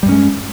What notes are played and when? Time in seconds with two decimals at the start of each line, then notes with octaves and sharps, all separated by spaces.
0.03 G3
0.06 G2
0.09 C#4
0.12 G#3